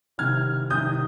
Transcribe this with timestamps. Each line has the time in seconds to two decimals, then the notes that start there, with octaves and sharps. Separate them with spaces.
0.18 C2 C3 D#3 F6 G#6
0.70 C2 C3 D#3 D#6 G6